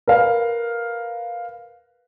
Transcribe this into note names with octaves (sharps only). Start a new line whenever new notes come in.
A#4 B4 F5